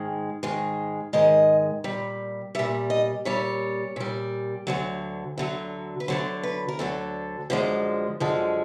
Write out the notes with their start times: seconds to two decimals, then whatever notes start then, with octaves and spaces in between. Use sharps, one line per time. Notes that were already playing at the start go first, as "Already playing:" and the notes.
Already playing: G#2 D#3 G#3
0.43 G#2 D#3 G#3
1.13 G#2 D#3 G#3 D#5
1.84 A#2 G3
2.55 A#2 G3 E5
2.90 D#5
3.25 A#2 G3 C#5
3.96 A#2 G3
4.67 D2 D3 F#3
5.38 D2 D3 F#3
6.00 B4
6.08 D2 D3 F#3 C5
6.43 B4
6.68 A#4
6.79 D2 D3 F#3 A4
7.50 F#2 D3 F3 G#3
8.20 F#2 D3 F3 G#3